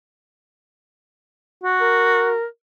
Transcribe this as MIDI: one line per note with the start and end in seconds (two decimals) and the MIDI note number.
1.64 2.35 66
1.81 2.45 70